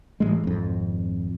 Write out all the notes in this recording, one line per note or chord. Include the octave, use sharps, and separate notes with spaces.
A1 G#3
G#1 F2